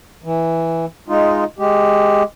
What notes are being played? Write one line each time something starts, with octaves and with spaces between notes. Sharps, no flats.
E3
G#3 D#4 F4
G#3 G4